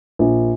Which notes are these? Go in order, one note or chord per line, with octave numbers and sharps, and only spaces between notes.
A#1